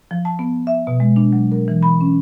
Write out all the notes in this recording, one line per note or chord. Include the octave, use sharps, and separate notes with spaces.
F3
A5
B3
E5
B2
G#3
D4
F#3
A#4
E3
B5
C#4